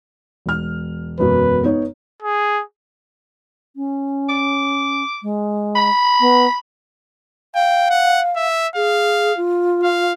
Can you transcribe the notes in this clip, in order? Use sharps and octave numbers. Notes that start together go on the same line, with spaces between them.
E1 F6
E1 F#2 B2 B4
B3 D#4 C#5
G#4
C#4
D6
G#3
B5
B3
F5 G5
F#5
E5
G#4 F5
F4
F5